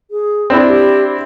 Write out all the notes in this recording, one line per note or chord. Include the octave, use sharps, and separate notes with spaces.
G#4
C4 D4 E4
G4